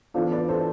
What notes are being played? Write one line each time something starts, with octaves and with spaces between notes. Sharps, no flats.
E3 B3 D4 F4 A4 C5
B4 D5
A4 C5